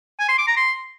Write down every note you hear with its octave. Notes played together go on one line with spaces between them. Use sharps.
G#5
C6
D6
A#5
C6